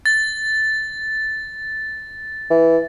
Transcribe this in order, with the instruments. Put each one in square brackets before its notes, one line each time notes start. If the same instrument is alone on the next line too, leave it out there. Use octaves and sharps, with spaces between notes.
[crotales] A6
[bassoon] E3